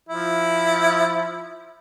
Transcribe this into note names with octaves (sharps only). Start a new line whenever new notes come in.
F3 E4